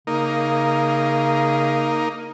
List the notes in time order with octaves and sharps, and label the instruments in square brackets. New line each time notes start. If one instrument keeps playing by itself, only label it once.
[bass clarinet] C#3 [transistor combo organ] A#3 D#4